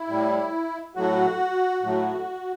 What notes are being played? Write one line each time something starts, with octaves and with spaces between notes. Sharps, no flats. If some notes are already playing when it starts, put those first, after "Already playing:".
Already playing: E4
A2 G3
A2 F#3 A3 F#4
A2 F#3 A3